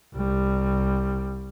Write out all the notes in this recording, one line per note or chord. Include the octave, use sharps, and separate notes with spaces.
C2 G3